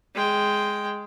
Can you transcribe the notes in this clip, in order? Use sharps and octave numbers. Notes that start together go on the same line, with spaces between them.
G#3 G5